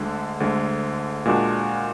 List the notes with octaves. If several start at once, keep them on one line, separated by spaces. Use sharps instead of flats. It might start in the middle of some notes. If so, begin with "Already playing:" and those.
Already playing: D2 D3 G#3
D2 D3 G#3
A#2 G#3 D4 F#4